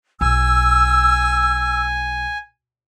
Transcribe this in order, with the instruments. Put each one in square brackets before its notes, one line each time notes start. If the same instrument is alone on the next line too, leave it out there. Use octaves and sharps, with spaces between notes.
[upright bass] B1 [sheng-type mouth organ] G#5 [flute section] E6